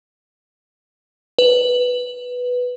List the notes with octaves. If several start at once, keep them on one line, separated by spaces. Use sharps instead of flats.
B4